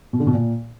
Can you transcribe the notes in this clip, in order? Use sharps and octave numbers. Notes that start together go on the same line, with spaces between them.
B2
D3
B2
A#2